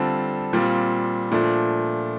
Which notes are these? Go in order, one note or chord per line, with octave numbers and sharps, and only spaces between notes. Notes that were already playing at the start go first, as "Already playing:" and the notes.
Already playing: D3 G3 C4 F4 A4
A#2 G3 C4 F4
A#2 F3 A3 D4